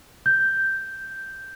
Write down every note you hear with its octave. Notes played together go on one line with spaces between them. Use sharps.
G6